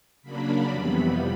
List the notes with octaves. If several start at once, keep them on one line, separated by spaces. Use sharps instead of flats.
C#3 F#3 A#3 D4 B5
F2 C3 E3 G3 B3